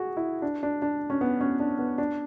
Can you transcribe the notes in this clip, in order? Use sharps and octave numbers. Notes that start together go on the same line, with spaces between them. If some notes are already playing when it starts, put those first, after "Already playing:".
Already playing: F#4 G#4
E4
D4
D4
D4
C#4
B3
C#4
D4
B3
D4